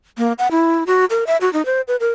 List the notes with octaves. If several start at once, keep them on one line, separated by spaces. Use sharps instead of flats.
A#3
F#5
E4
F#4
A#4
E5
F#4
D#4
C5
B4
A#4